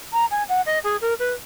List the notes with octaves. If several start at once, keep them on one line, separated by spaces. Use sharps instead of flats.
A#5
G#5
F#5
D#5
G#4
A#4
B4